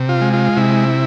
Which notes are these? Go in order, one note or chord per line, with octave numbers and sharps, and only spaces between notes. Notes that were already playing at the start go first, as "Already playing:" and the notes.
Already playing: C3
F4
G#3
F4
C3 E4